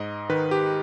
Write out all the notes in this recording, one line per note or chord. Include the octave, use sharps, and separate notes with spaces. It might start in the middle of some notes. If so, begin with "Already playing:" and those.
Already playing: G#2 D#5
D#3 B4
G4